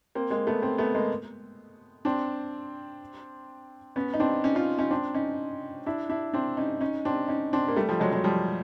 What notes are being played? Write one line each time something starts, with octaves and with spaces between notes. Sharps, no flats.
A#3 C4
G#3 A#3
A3 B3
A#3 C4
A3 B3
G#3 A#3
C4 D4
B3 C#4
D#4
C4 D4
C#4 D#4
D#4 F4
C#4 D#4
C4 D4
C#4 D#4
D4 E4
D4 E4
C4 D4
C#4 D#4
C#4 D#4
C4 D4
C#4 D#4
C4 D4
A#3
G3 A3
F3 G3
F#3 G#3
F#3 G#3
F3 G3